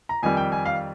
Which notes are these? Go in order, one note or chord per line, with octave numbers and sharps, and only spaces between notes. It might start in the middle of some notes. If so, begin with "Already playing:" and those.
A#5
F2 D#3 G3 G#5
G5
G#5
F5